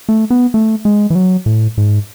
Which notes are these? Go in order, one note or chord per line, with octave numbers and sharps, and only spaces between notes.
A3
B3
A3
G#3
E3
F#3
A2
G#2